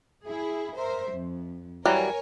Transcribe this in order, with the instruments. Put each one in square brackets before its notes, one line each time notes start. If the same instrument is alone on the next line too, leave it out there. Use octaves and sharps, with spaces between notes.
[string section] E4 G#4
A#4 C5 E5
F2
[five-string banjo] E3 F#3 G3 [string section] A#4 C#5 G#5